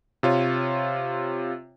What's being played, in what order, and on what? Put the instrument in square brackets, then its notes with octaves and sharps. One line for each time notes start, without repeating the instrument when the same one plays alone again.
[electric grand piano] C3 F4 C#5